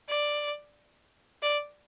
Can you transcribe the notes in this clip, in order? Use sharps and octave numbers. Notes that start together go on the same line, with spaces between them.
D5
D5